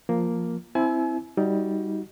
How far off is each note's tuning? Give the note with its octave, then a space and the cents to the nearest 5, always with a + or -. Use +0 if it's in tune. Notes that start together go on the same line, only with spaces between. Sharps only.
F3 +0 A#3 +0
C4 +0 E4 +0 G#5 +40
G3 +0 D#4 +20 F#4 +0